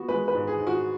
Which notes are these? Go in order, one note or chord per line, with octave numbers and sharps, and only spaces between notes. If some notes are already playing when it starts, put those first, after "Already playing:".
Already playing: B3 F#4
G#3 B4
B4
G#2
G#4
G#2
F#4